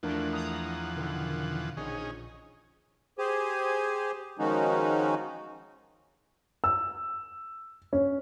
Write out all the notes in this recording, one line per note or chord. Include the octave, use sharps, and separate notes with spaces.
E2 F3 A3 D4 A#4 F#5
A#5 D#6
B2 D3 D#3
A#1 C#4 D#4 G#4
G4 G#4 C5 G#5
D#3 F3 G#3 C#4 D#4 F#4
E6
C#4